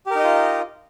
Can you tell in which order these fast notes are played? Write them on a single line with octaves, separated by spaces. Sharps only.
G4 A#4 D#4 D#5 F4